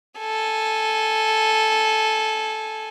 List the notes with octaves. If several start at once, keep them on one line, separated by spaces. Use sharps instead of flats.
A4 G#5